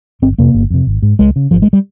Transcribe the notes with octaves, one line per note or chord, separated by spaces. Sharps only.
G1 C4
F2 C3 A#3
G1
F2 C3
G#1
G#2
C#2 G#3
C#3
G#1 F3
G#3
G3